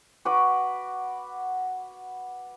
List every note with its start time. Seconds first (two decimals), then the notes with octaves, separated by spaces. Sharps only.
0.25 F#4 B4 B5 D6